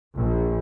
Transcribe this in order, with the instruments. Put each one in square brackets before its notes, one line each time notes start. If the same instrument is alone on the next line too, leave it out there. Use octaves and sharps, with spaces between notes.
[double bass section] A#1